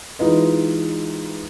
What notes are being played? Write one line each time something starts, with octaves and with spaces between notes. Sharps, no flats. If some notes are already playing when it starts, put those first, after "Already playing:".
E3 G#3 D#4 F4 B4 D#5